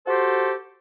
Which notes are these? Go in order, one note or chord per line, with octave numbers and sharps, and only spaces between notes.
F#4 G4 A4 C5